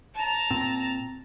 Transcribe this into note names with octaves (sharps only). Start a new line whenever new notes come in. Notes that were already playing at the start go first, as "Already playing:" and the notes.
A5 A#5
A#2 C4